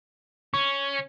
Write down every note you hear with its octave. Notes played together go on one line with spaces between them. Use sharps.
C#4 C#6